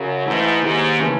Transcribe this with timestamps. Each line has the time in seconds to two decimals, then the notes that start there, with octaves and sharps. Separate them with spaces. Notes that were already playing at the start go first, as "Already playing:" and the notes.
Already playing: F#2 C#3
0.26 G#2 E3 A3 E4
0.62 D#2 G#2
0.99 C#3 E3 A3 C#4